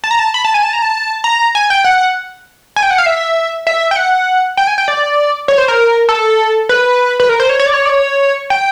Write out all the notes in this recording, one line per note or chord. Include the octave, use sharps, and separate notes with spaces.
A5
A#5
A5
B5
A5
G#5
A5
A#5
A5
A#5
G#5
G5
F#5
G#5
G5
F#5
F5
E5
E5
G5
F#5
G5
G#5
G5
D5
C#5
C5
A#4
A4
B4
B4
A#4
C5
C#5
C#5
D5
C#5
D5
C#5
G5